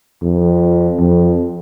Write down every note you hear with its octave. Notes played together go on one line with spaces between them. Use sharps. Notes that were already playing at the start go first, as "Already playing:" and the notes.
F2
F2